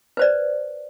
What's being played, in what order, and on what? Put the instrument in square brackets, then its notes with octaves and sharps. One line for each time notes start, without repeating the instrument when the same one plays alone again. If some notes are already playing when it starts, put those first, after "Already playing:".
[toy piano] B4 C5 D5